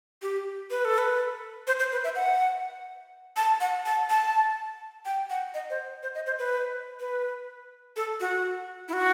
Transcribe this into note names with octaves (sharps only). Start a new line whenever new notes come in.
G4
B4
A4
B4
C5
C5
B4
E5
F#5
A5
F#5
A5
A5
G5
F#5
D#5
C5
C5
D#5
C5
B4
B4
A4
F#4
E4
F#4